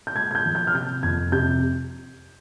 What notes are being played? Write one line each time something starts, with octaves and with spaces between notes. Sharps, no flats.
G6
G#3 G#6
G#6
G6
F3
G6
F6
C3 G6
F2 G#6
C3 G6